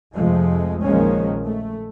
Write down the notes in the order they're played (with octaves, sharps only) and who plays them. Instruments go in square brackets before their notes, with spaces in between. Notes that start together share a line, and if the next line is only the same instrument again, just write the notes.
[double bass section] F2 C3 F3 G#3 A3
A#1 D#3 F3 G#3 A#3 C#4
A3